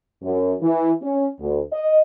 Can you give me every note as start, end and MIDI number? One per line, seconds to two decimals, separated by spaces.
0.23 0.54 42
0.62 0.91 52
1.02 1.28 61
1.40 1.61 38
1.73 2.02 75